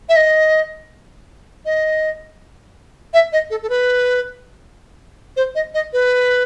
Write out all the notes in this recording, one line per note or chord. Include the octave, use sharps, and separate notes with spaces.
E5
D#5
D#5
E5
D#5
A4
A4
B4
C5
D#5
D#5
B4